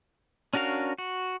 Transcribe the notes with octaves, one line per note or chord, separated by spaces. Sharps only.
C#4 D4 F#4 A#4 F5
F#4